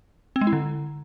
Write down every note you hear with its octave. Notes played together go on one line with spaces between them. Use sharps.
C4
G#3
E4
D3